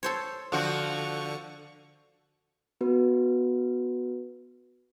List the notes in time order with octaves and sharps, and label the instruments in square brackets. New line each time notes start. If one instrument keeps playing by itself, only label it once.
[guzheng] A4 C5 C#5
[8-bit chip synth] D3 C#6 [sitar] F3 F#4
[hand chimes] B3 F#4 B4